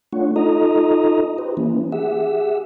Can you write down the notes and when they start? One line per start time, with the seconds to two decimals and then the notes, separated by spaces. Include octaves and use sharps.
0.13 A3 D4 F4 C#5 F#5
0.36 D#4 F4 A4 D#5 A#5 D#6
1.38 G4 B4 C5
1.57 E3 A#3 C#4 E4
1.92 G4 G#4 E5 F#5 E6